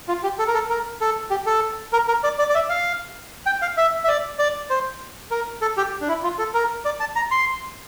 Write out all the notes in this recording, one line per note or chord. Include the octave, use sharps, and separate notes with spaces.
F4
G4
A4
A#4
A4
A#4
A4
G4
A4
A#4
A#4
D5
D5
D5
E5
F5
G5
F5
E5
E5
D5
D5
C5
A#4
A4
G4
D4
E4
F4
A4
A#4
D5
A5
A#5
C6